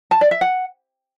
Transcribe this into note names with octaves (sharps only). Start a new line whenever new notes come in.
A5
D5
E5
F#5